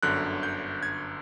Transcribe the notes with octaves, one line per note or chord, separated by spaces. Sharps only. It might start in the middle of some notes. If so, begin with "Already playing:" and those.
G1 F#2 D3 F#6
G6
G#6